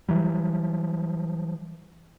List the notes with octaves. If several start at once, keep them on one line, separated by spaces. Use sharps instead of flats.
E3 F#3 G3